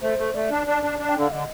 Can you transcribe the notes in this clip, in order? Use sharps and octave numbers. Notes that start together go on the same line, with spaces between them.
A3 C5
A3
A3 D5
D4
D4
D4
D4
G5
D3 F5
D3 D#5